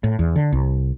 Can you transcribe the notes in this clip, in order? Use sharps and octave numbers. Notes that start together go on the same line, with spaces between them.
A2
E2
D3
C2